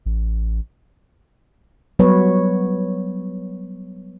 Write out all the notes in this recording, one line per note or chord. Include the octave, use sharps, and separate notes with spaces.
A1
F#3 G3 B3 B4 C#5